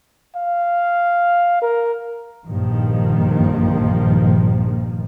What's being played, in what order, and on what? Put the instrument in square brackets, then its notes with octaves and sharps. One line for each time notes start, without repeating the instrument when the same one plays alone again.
[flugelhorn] F5
A#4
[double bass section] A#1 G2 D#3 F3 A#3